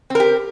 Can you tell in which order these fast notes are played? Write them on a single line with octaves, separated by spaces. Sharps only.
C4 A#4 G4